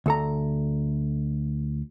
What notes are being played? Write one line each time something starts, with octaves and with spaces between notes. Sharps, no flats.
D2 A4 A#5